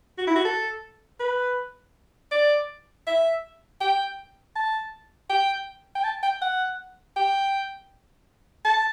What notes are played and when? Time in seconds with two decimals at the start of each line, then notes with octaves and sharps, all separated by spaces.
0.18 F#4
0.27 E4
0.36 F#4
0.45 A4
1.20 B4
2.32 D5
3.07 E5
3.81 G5
4.56 A5
5.30 G5
5.95 G5
6.04 A5
6.23 G5
6.42 F#5
7.17 G5
8.65 A5